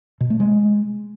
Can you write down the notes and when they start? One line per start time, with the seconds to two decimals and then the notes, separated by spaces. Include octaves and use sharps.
0.21 B2
0.30 A3
0.40 G#3